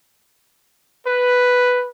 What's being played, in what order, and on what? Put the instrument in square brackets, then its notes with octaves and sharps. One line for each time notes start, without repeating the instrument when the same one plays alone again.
[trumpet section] B4